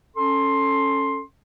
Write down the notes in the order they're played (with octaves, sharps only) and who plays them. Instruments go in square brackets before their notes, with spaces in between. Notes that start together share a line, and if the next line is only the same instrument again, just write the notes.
[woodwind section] C#4 A4 C6